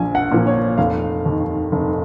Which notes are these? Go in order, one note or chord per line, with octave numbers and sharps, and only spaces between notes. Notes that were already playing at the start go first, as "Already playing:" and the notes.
Already playing: A#1 F3 G#5
F#5
A#2 F3
C#5
F1 F5
D#2 D#3
F1